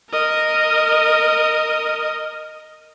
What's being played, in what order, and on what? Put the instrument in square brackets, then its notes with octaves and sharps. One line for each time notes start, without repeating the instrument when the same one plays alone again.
[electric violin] A#4 D#5